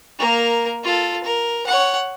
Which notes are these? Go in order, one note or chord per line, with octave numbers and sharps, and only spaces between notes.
A#3 A#4
F4 A4
A#4
C#5 F#5